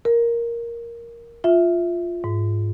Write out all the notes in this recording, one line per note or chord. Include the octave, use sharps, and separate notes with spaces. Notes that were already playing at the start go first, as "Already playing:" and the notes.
A#4
F4 E5
G#2